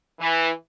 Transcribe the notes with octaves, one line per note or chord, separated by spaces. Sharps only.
E3